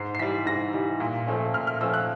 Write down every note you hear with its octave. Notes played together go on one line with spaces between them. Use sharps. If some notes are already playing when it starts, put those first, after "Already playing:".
Already playing: G#2 C7
C7
E3 G3 B6
G#2 A#6
E3 G3
A#2
F3 A3 C#4
A#2 F6
F6
F3 A3 C#4 E6
F#6